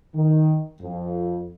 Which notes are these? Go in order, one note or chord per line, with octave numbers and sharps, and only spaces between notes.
D#3
F2